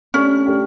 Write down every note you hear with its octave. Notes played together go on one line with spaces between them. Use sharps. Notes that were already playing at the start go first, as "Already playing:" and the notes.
A3 C#4 D4 G4
A3 D4 G4